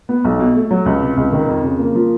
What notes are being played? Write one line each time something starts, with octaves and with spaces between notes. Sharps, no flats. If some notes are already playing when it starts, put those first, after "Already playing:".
B3
B1
B2
A3
F#3
C#2
C3
C#2
D#3
F2
C#3
A#3
F3